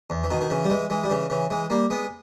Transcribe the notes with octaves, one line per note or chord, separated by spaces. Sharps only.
E2
E3
B2 D#3
D#3
C#3 E3
G3
E3 G#3
E3 G#3
G3
C#3 E3
C#3 E3
E3 G#3
G3 A#3
G#3 B3